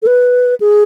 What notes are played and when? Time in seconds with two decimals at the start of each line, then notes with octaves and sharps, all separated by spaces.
0.02 A4
0.07 B4
0.60 G#4